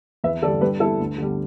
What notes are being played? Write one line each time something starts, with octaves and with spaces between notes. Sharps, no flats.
E2 B4 E5
D3 G3 A4 D5
G2 G4 B4
G3 E4 A4
D2
D3 G3